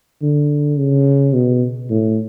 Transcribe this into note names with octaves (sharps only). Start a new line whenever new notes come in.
D3
C#3
B2
A2